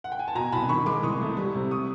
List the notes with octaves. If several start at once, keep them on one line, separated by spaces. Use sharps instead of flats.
F#5
G5
G#5
A5
B2 G#5 A#5
C2 A5 B5
D#3 B5 C#6
G#3 C6 D6
C2 C#6 D#6
A3
G3
C3
C#6 D#6